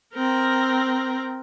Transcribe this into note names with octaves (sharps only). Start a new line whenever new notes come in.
C4 A#4